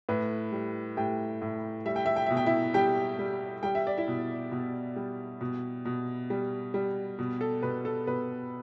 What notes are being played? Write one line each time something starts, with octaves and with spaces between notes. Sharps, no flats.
A2 B4
G3
A2 G4 G5
A2
G3 E5
G5
E5
G5
B2 E5
G5
E4 E5
G3 G4 G5
G3
G3 G5
E5
D5
E4 E5
B2
B2
G3
B2
B2
G3
G3
B2
A4
B2 B4
A4
B2 B4